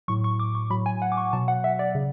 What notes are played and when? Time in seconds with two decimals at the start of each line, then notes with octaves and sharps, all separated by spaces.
0.08 A2 F#3 C#6
0.24 C#6
0.40 D6
0.55 C#6
0.70 F#3 B5
0.73 A2
0.86 G#5
1.02 F#5
1.12 D6
1.17 C#6
1.33 B2 F#3 A5
1.48 F#5
1.64 E5
1.79 D5
1.95 C#3